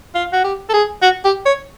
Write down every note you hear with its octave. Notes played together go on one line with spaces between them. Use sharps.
F4
F#4
G4
A4
G#4
F#4
G4
C#5